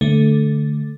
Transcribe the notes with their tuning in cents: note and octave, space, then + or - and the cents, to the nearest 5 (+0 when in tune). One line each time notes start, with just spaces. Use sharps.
D3 +0 A3 -10